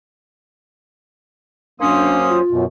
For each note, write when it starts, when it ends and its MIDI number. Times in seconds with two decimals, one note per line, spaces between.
1.80 2.41 42
1.80 2.38 58
1.80 2.38 61
1.80 2.17 62
1.80 2.41 72
1.80 2.38 87
2.30 2.63 65
2.51 2.65 42
2.51 2.65 47